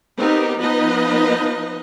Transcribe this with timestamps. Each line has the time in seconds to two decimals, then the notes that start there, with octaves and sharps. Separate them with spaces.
0.19 B3 C4 D#4 G4 A#4
0.59 F3 B3 D#4 B4 D#5